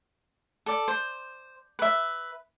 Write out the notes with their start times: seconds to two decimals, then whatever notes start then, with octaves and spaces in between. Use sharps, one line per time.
0.66 A4 D5
0.88 C5
1.79 B4 E5